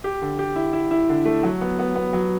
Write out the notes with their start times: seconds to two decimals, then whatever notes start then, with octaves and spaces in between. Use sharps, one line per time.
0.04 G4
0.22 D3
0.39 G4
0.56 E4
0.73 E4
0.91 E4
1.09 D3
1.25 A3
1.43 F#3
1.61 B3
1.79 B3
1.95 B3
2.13 F#3